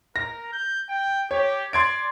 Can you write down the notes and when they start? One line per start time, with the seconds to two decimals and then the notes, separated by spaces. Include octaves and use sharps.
0.16 A#4 A#6
0.53 G6
0.89 G5
1.31 G4 C#5
1.73 D5 C6 G#6 D7